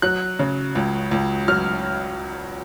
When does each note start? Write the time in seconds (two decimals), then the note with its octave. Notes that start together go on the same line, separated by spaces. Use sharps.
0.02 F#3 F#6
0.39 C#3
0.75 C#2
1.11 C#2
1.48 F#3 F6